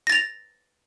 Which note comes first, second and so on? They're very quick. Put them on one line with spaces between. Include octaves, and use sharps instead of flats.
A#6 A6 F7